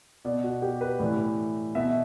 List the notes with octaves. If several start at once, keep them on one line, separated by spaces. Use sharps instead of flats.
B2 D5
F#4
G4
B4
A2 E3 D5
B2 E5